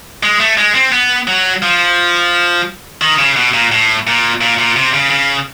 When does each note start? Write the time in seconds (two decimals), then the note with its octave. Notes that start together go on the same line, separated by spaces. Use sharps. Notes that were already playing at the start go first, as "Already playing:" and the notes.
0.23 G#3
0.40 A3
0.58 G#3
0.75 C4
0.92 B3
1.27 F#3
1.62 F3
3.02 D#3
3.19 C#3
3.37 B2
3.54 A#2
3.72 A2
4.07 A#2
4.41 A#2
4.59 A#2
4.76 C3
4.94 C#3
5.11 C#3